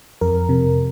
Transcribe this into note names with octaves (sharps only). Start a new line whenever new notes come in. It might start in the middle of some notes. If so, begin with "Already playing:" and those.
F2 A#4
C3